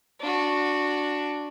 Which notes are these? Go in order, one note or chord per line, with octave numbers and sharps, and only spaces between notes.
D4 F#4